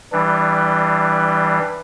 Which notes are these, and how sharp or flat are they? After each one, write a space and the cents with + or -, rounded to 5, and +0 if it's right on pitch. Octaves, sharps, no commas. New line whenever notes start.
E3 +0 G3 +0 D4 +25